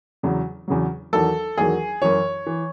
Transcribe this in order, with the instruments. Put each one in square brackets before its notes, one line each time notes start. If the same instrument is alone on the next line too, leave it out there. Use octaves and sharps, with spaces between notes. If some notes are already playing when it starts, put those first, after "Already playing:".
[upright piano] E2 C#3 F#3
E2 C#3 F#3
E2 D#3 F#3 A4
E2 D#3 F#3 G#4
F#2 E3 C#5
E3